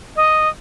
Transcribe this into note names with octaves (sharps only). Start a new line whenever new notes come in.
D#5